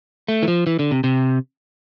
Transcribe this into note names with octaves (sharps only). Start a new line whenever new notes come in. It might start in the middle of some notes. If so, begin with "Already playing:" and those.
A3
E3
F3
E3
D3
C3
C3